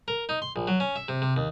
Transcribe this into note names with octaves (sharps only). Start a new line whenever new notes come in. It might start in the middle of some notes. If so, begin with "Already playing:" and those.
A#4
D#4
C6
A#1
F#3
C#4
E5
C3
C3
D#2